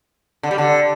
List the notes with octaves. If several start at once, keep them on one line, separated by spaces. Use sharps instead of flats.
D3
G3
D3